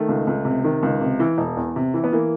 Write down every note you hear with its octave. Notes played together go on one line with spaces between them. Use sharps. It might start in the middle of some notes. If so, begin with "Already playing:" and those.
Already playing: D#3 A3
C#2
C#2
C3
D#3
C#2
C3
E3
E1
E2
C3
E3
B3
E3 A#3